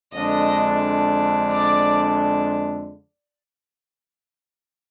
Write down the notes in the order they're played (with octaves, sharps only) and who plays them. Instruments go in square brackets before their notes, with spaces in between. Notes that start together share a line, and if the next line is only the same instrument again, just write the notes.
[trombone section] F2 D3 G#3 D4 [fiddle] D#5
[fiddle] D5